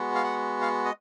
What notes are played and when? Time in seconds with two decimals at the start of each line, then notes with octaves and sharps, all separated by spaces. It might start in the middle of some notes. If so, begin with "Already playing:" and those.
Already playing: G#3 B3 F#4
0.15 F5
0.24 F#5
0.61 F5
0.85 D#5